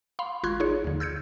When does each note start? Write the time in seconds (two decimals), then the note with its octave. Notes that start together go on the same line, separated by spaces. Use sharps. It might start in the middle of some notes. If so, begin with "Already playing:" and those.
0.19 F5 B5 C6
0.44 G#1 F4 C6 C#6 F#6 G#6
0.60 D#4 G#4 C#5
0.84 D#2 D3
1.00 E6 G6 G#6 C#7